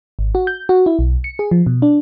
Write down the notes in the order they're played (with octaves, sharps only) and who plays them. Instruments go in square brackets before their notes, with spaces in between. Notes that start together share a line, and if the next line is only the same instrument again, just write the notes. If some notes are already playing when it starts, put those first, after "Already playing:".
[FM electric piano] G#1
F#4
G6
F#4
E4
B1
C#7
G#4
F3
B2
D4